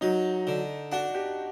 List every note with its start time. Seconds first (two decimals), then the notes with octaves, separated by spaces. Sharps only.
0.01 F#3 D#4
0.47 D3
0.92 D4 F#4
1.15 G4